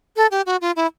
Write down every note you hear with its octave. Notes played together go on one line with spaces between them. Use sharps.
A4
G4
F#4
F4
E4